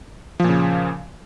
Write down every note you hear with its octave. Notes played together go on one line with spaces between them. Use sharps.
A#2 C#3 F3